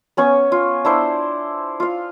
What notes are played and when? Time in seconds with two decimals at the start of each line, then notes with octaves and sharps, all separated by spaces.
0.17 B3 C#4 G#5 C#6
0.52 F4
0.85 D4 E4 C5
1.80 F4 F5